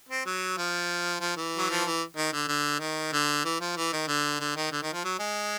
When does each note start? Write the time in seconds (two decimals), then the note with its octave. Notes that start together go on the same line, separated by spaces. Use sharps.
0.09 C4
0.26 F#3
0.57 F3
1.20 F3
1.36 E3
1.57 F#3
1.70 F3
1.85 E3
2.17 D#3
2.33 D3
2.48 D3
2.80 D#3
3.13 D3
3.45 E3
3.61 F3
3.77 E3
3.93 D#3
4.08 D3
4.40 D3
4.56 D#3
4.72 D3
4.83 D#3
4.93 F3
5.04 F#3
5.19 G#3